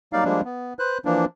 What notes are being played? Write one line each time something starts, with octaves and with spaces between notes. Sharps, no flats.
F#3 G3 A#3 D#4 D5 F5
F3 G3 G#3 A#3 D4
B3
B4 C5 F#6
E3 F3 A#3 D4